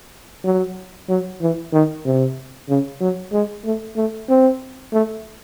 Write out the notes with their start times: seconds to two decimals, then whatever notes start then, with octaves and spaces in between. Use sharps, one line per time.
0.44 F#3
1.09 F#3
1.41 E3
1.73 D#3
2.05 C3
2.69 C#3
3.01 F#3
3.33 G#3
3.65 A3
3.96 A3
4.29 C4
4.93 A3